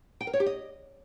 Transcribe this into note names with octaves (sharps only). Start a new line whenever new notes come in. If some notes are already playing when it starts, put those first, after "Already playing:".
G5
A#4
C#5
G4
D#5